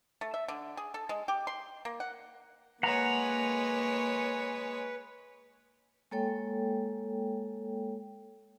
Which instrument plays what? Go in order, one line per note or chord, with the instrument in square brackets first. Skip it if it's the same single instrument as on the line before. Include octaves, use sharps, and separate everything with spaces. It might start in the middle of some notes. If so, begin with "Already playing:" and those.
[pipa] A3
E5
D3
G#4
A4
G#3
G4
C6
A#3
F#5
[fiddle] G#3 C#5 [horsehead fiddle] A#3 [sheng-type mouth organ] B4 [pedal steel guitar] F#5 A#5
[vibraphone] G#3 A#3 A4 C#5 G5